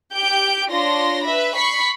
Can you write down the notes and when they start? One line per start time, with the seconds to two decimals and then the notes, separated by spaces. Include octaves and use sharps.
0.13 G4 G6 D7
0.70 D4 F4 C#5 C6 A#6
1.25 B4 E5 B5
1.55 B5 C#6 B6 C7